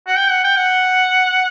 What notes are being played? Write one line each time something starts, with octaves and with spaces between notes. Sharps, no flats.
F#5
G5
F#5
G5
F#5